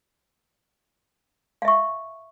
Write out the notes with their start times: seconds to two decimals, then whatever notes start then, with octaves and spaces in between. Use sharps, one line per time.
1.62 F5
1.65 E5
1.68 C#6